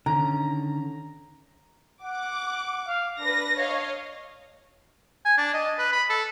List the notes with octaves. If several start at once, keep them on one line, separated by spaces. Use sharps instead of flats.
D3 D#3 C#4 A#5
F#5 D6
F5
D4 B4 A#6
C#5 D#5 F5
G#5
D4
D#5
B4
B5
A4